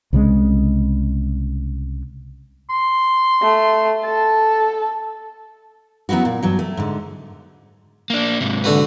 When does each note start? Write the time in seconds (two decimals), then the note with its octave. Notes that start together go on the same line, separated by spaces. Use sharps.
0.13 C2 C#3 G#3
2.70 C6
3.42 A3
4.04 A4 A5
6.09 F#3 B3 C#4 E4 F#4
6.25 A#2
6.43 G2 F#3
6.59 A3
6.77 G#2 D3
8.10 A#3 D4
8.41 G#2 C3
8.64 D3 F#4 B4